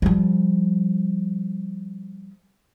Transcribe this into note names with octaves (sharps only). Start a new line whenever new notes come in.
F3 G3